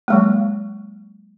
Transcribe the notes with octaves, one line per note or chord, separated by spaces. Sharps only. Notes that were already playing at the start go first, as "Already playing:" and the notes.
F#3 G#3 A#3